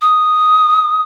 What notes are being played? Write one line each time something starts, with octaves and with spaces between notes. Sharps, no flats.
D#6